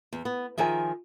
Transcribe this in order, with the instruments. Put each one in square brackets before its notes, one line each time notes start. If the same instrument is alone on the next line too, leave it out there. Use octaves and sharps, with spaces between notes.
[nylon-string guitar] E2
B3
[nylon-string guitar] D#3 F3 E5 [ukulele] G#4 A#4 G#5